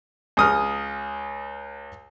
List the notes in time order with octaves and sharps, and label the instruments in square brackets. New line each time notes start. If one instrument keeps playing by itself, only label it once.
[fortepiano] C#2 D#6 F6